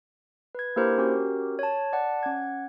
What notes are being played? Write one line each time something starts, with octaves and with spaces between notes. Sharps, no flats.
B4 G#6
A#3 D4 E4 G4 A#4 C5
C#4 F#4 G4 A#4
C#5 A5
D5 F#5 A5
C#4 F#5 G#6